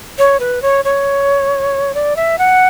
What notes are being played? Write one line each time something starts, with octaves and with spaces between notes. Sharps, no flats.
C#5
B4
C#5
C#5
D5
E5
F#5